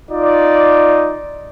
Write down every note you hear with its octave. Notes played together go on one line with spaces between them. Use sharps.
D#4 F4 D5